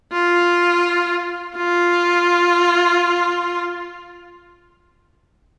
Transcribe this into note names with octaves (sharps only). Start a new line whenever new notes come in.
F4
F4